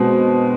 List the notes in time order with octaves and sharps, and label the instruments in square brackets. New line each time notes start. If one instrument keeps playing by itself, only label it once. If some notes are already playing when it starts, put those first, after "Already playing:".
Already playing: [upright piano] B2 G#3 C4